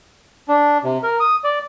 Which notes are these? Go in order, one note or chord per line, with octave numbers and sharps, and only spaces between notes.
D4
C3
A#4
D#6
D5